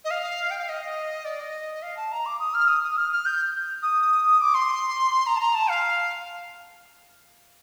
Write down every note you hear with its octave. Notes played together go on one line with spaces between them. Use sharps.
D#5
F5
G5
F5
D#5
D5
D#5
F5
A5
A#5
D6
D#6
F6
D#6
D#6
F6
F6
G6
D#6
D6
C6
A#5
A5
A#5
A5
F5